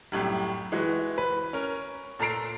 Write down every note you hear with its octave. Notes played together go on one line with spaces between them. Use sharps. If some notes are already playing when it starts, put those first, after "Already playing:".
C2 F#2 A2 G3
E3 G#3 F#4
B4
C#4 A#4
A#2 A4 A5 A#5 C7 D7